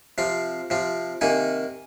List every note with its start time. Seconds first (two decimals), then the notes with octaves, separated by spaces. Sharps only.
0.18 C3 F3 C4 F5
0.70 C3 F3 C4
1.21 C3 D#3 A#3 D#4 G#5